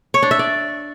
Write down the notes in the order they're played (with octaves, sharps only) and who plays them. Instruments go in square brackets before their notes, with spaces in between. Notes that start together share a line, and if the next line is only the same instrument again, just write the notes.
[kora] C#5
D4
E5
D5